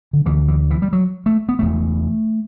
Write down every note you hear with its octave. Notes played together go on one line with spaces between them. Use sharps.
D3
D2 D3 E3
E3
E3
G3
F#3
A3
B3
E1 E2 B2 A3